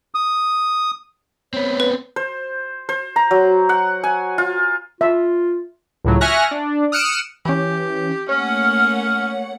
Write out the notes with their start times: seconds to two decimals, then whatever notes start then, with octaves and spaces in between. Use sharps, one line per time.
0.15 D#6
1.53 B3 C4 C#5
1.80 B4
2.16 C5
2.89 C5
3.16 A#5
3.31 F#3
3.69 F#5
4.04 G#5
4.38 F4
5.01 F4 E5
6.04 C#2 A2 F#3
6.21 E5 G#5 C#6 F6 F#6 A#6
6.51 D4
6.92 D#6 F6 F#6 C#7 D7 E7
7.45 E3 C#4 G4
8.29 A3 A#3 C#4 C#5 F#5 F6